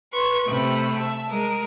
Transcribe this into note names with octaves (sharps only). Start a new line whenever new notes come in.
B4 C6 C#6
C3 A3 G4 B5
E5 A5
G#3 A#4